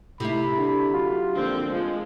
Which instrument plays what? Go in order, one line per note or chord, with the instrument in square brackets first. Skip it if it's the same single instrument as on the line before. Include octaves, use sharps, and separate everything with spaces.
[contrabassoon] A2 [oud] C3 E4 [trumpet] B5
[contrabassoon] D3
[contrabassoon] F#3 [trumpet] F4
[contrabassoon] A#1 [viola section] D3 C4
[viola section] F3 G#3